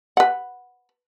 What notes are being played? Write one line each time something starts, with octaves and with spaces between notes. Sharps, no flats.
B4 F#5